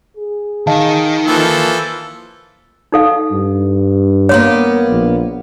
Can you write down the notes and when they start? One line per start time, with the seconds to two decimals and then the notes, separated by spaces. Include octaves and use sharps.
0.17 G#4
0.67 D#3 D#5 F5 A5
1.27 E3 F3 A#3 A4
2.92 D#4 A4 F5
3.32 G2
4.29 A#3 B3 C#5 F5 C6
4.89 A#1